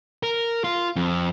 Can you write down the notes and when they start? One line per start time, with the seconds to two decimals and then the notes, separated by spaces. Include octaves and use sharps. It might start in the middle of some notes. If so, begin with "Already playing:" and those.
0.23 A#4
0.64 F4
0.96 F2